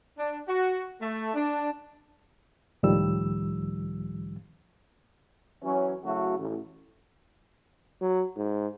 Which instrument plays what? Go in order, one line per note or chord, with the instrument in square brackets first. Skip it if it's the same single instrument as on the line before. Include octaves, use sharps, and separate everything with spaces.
[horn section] D4
F#4
A3
D4
[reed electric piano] C#2 A2 D#3 F3 G3 E6
[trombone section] E3 F#3 C#4
C#3 F#3 A3 E4 F#4
A1
[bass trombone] F#3
G#2